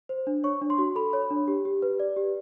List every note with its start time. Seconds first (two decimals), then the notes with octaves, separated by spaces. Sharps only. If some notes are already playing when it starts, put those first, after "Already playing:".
0.09 C5
0.27 D4
0.44 C#5 C#6
0.62 D4
0.70 C6
0.78 F#4
0.95 A4 B5
1.13 C#5
1.30 D4
1.48 G4
1.65 G4
1.82 B4
2.00 D5
2.16 G4